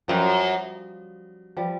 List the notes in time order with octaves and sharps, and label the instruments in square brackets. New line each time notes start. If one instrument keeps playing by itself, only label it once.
[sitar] F#2 [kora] F3 G3
[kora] F3 G3